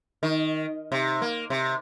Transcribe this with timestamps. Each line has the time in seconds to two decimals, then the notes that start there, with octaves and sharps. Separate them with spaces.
0.23 D#3
0.92 C3
1.22 A#3
1.50 C3